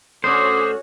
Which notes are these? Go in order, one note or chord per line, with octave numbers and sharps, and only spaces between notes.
D2 D3 C#4 F#4 C5 C#5 D6 D#6